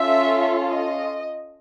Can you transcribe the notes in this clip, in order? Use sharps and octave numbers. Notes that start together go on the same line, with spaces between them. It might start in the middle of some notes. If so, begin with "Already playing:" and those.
Already playing: C#4 F4 A4 E5
D#5